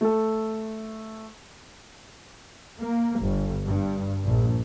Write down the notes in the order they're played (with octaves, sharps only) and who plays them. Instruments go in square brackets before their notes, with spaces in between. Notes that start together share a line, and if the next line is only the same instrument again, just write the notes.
[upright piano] A3 A4
[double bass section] A#3
G1
G2
A#1